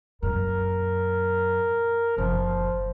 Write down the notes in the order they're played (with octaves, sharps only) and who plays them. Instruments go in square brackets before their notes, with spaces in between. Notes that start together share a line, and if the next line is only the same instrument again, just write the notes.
[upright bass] F#2 A#2 [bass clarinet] A#4
[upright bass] F#1 A#2 [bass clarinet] F3